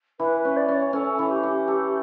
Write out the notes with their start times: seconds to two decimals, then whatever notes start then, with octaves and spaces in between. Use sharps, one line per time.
0.19 E3 B4
0.38 B4
0.45 C#4
0.57 D5
0.68 C#4
0.75 C#5
0.93 C#4 A4
1.19 E3
1.31 G4
1.43 C#4
1.68 A4